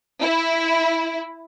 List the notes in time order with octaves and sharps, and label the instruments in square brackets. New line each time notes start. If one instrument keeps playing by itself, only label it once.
[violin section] E4